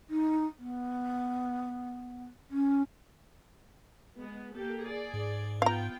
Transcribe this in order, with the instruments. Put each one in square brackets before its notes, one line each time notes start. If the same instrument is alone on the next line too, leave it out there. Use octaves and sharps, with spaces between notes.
[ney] D#4
B3
C#4
[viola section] G#3 B3
A#3 G4 A4
G#4 D5
[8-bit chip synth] G#2
[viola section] B3 F4 G5 [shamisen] F5 A#5